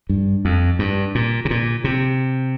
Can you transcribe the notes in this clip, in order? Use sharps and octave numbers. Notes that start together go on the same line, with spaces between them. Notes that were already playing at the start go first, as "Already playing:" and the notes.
G2
F2
G2
A#2
C3
A#2
C3